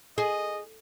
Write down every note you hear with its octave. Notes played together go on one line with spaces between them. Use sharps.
G#4 D#5